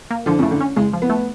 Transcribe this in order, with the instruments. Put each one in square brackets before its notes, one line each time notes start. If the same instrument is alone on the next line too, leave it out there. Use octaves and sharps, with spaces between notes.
[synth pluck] A#3
[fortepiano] D3 [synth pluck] F3
[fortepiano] C#3 [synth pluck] A3
[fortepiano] D3
[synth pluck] C#4
[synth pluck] C#3 [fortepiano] G#3
[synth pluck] F3
[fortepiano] B3
[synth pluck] A3